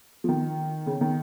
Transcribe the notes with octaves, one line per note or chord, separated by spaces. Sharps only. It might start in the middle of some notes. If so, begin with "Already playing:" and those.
F3
D#3
C#3
D#3